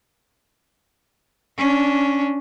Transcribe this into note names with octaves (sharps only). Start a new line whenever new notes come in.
C#4 D4